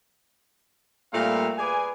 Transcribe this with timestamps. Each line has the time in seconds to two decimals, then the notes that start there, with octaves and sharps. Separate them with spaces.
1.13 A#2 G3 A3 A#3 C4 F5
1.58 G#4 B4 D5 G#5